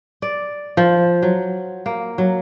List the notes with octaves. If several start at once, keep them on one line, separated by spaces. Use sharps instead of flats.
D5
F3
F#3
A#3
F#3